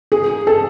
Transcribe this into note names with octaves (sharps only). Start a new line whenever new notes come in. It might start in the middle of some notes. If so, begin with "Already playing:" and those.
G#4
A4